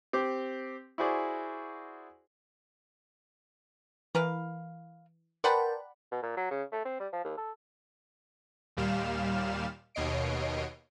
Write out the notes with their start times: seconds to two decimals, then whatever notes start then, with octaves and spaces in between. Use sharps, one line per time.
0.13 C4 G4
0.98 E4 F#4 G#4 C5 D5
4.15 E3 A#4 B4 F5
5.44 A#4 B4 D5 F#5 G5 A5 B5 C6
6.12 B2
6.23 A#2
6.37 F#3
6.51 C#3
6.72 A3
6.85 C4
7.00 G3
7.13 F3
7.24 D#2
7.37 A4
8.77 D#2 A#2 G3 F5 F6 E7
9.95 D#2 B2 C#5 D#5 C7 D7